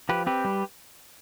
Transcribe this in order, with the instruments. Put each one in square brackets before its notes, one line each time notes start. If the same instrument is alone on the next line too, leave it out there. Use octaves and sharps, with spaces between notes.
[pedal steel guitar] F3 G4 B4
C4 G4 B4
G3